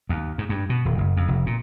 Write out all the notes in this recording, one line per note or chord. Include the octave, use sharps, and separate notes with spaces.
D#2
G#2
G2
B2
D#1
F#1
F2
F1
A#2